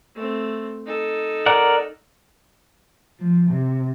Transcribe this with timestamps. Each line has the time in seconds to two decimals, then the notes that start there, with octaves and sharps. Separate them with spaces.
0.16 A3 C4
0.86 D#4 A4
1.46 A#4 D5 F#5
3.20 F3
3.51 C3